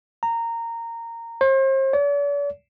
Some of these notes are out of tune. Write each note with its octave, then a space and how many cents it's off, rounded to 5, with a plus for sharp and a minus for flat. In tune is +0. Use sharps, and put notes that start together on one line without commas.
A#5 -15
C5 +40
D5 -45